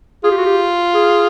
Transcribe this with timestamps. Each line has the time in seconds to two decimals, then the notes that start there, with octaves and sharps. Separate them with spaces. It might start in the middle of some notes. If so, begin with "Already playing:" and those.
0.24 F4 G#4
0.31 G4
0.38 F#4
0.46 G4
0.94 G#4